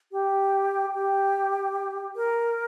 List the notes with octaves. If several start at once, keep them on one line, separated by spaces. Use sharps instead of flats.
G4
G4
A#4